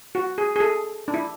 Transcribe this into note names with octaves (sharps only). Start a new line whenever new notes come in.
F#4
G#4
G#4
A4
D4
E4